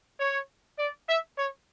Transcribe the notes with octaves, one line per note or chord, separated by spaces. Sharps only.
C#5
D5
E5
C#5